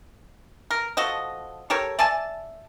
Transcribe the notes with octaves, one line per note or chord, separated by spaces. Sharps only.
A#4
F3 F#4 A4 D#5
G4 A4 A#4 C#5
D5 E5 G#5 A5